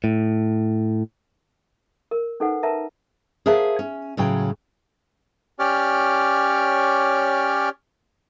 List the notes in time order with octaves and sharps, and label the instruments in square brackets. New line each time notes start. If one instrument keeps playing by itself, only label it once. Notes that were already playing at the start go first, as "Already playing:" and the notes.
[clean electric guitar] A2
[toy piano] A#4
C#4 D#4 A4 B4 C5 F#5
A#4 B4 E5 A5 A#5
[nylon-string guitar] G#4 A#4 C5 E5 F5 A5
C#4
A2 C#3 F#3 G5
[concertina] C#4 G4 C#5 D5 F6